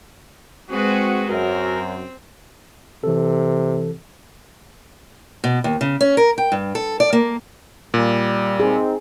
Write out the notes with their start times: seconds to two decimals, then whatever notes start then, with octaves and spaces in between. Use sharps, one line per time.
0.70 G#3 C4 F#4 G#4 B4
1.28 F#2 C4 F#4 A#4
3.04 C3 E3 A4
5.44 B2
5.64 D#2
5.81 C#3
6.01 C#4
6.17 A#4
6.38 G5
6.52 G2
6.75 A4
7.00 D5
7.13 A#3
7.94 A#2 G3
8.60 C4 D#4 G#4